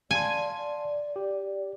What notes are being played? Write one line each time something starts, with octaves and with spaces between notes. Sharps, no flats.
D5 F5 G#5 A5 C6
D5
G4